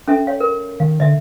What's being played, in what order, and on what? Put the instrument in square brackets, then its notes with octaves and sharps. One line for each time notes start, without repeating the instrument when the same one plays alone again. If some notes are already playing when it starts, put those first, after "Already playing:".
[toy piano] C#4 A4 E5
C#5 F5
A#4
[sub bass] D#3 [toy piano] F5
[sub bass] D3 [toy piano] D#5 E5